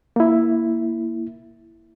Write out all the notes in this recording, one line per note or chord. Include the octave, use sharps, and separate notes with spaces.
A#3 E4